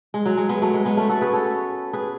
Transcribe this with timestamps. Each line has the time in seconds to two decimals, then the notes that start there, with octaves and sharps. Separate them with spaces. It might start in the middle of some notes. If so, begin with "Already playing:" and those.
0.14 G#3
0.26 F#3
0.37 G#3
0.49 G#3 B3
0.62 F#3 A3
0.73 G#3
0.85 G#3 B3
0.97 A3 C#4
1.09 F#4 A4
1.22 G#4 B4
1.33 A4 C#5
1.93 G#4 B4